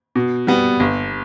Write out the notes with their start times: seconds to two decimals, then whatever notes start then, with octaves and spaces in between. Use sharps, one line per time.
0.15 B2
0.47 G3 B3
0.80 G1